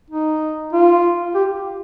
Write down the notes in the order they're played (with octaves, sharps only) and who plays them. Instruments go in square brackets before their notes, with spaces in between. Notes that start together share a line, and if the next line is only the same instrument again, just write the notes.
[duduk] D#4
F4
G4